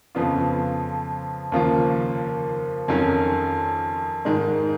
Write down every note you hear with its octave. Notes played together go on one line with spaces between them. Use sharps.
F2 C#3 F3 B3 F4
D#2 C#3 F3 A#3 F4
F2 D#3 F#3 C#4 F4
G#2 D#3 G#3